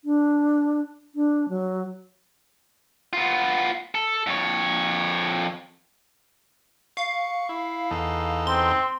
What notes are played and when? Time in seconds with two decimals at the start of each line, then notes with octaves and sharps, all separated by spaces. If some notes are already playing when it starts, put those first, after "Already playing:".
0.05 D4
1.15 D4
1.49 F#3
3.13 B3 F4
3.95 A4
4.27 F2 C#5
6.97 F5 C#6
7.49 E4
7.91 E2 D#4 A4
8.47 C4 C6